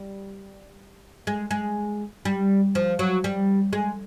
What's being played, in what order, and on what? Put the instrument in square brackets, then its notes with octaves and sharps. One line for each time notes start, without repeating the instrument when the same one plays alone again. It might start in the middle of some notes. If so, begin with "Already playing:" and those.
Already playing: [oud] G3
G#3
G#3
G3
F3
F#3
G3
G#3